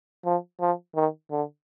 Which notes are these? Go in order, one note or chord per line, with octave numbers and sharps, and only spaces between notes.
F3
F3
D#3
D3